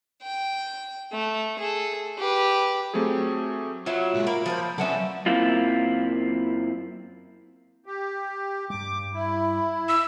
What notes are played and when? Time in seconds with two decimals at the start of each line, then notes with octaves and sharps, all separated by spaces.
0.23 G5
1.12 A3
1.59 G#4 A4
2.18 G4 B4
2.94 F#3 A3 C4 G4 G#4
3.86 F#3 C#4 F4 F#4 E5
4.14 A#2 G#3
4.27 A#3 B5
4.46 F3 A#3 C5
4.78 D3 F#3 B3 C#4 A4 E5
5.26 F#2 A#3 C4 E4 F4
7.86 G4
8.70 G2 G3 D6
9.14 E4
9.89 E6